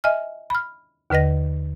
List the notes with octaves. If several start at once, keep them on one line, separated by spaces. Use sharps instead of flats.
D#5 E5 G#5 F6
B5 F6
D#2 D3 B4 D#5 A#6